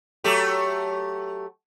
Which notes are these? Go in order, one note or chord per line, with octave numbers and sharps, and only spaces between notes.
F#3 A3 G4